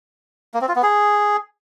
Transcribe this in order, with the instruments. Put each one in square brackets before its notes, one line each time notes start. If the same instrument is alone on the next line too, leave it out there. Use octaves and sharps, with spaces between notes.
[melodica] A#3
C4
F4
B3
G#4